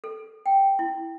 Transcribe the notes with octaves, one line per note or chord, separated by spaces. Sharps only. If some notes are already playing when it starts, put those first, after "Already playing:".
A4
G5
E4